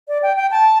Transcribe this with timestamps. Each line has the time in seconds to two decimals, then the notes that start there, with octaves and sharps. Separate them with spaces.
0.08 D5
0.23 G5
0.37 G5
0.51 A5